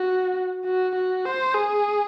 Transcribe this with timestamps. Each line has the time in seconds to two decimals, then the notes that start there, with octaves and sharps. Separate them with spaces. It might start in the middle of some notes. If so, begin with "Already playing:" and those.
Already playing: F#4
0.65 F#4
0.96 F#4
1.25 C5
1.55 G#4